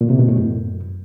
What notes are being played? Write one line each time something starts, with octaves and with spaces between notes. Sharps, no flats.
A#2
C3
B2
A2
F#2